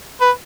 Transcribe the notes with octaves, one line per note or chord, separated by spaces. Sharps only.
B4